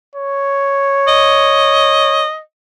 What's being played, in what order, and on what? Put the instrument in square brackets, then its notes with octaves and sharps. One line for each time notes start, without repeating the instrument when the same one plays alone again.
[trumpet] C#5
[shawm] D#5